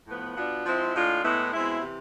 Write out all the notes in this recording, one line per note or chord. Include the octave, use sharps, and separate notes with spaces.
A2 F3 B3
B2 B3 D4 F4
F3 G#3 C4 E4
A2 G#3 D4 F4
A2 G#3 B3 E4
B2 G#3 C4 E4
C3 E3